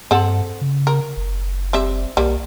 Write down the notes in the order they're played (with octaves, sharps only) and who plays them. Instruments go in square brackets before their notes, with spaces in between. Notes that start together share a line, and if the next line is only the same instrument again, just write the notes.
[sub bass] G2 [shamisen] C4 A4 F#5
[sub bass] C#3
[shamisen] A#4
[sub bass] F#1
[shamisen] G3 C4 E5
[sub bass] B1 [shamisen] G3 A#3